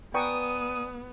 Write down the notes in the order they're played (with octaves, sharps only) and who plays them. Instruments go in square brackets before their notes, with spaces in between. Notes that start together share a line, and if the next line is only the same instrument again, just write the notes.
[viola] B3 [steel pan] B4 G5 C#6 [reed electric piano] D5 G#5 A#5 [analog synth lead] D#6